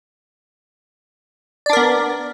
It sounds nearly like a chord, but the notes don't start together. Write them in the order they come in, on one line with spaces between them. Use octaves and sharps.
D5 D4 A#4 B3